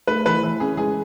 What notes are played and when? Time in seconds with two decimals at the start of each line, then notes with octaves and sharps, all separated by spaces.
0.07 A3 B4
0.26 E3 B4
0.43 E3
0.60 C#4 G#4
0.77 G#3 G#4